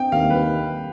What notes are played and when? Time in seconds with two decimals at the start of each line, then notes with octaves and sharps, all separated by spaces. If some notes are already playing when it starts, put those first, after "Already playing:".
Already playing: C4 G5
0.12 D#2 F5
0.30 G3 B4